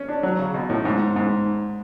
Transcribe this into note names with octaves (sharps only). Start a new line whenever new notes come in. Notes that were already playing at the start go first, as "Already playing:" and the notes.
Already playing: C#4
D4
F#3
C#3
B2
A2
G#2
G#2